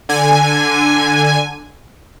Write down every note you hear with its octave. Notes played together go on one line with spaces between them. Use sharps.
D3 G#5